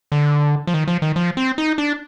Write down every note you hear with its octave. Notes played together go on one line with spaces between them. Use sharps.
D3
F3
D#3
F3
D#3
F3
C4
D#4
D4